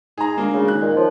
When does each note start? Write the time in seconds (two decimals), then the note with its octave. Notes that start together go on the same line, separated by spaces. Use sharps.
0.18 G#2 G#4 A#5
0.38 D2 G#3 A#3
0.53 C#3
0.68 D#3 F#6
0.81 A#2 D#5
0.96 F3 C#5